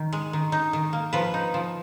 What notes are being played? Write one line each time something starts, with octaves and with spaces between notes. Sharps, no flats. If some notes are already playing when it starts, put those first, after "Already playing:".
Already playing: D#3
G#3
D#3
D#4
D#3
A#3
F3 B4
D#4
F3